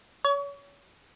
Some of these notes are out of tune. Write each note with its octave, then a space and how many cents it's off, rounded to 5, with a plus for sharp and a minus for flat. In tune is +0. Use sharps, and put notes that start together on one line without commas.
C#5 +35